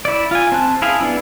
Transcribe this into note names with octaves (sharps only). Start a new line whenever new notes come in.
E4 D5
F4 G#5
C4 A5 F#6
E4 G#4 F5
B3 D4 E4